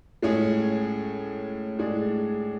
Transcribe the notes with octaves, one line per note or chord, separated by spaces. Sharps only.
A2 G#3 C#4 G#4
A2 G#3 D4 G#4